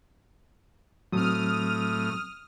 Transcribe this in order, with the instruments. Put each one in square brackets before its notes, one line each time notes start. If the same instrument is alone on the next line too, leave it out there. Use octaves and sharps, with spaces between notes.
[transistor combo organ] A2 [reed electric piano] F#3 C4 [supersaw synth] D#6 F6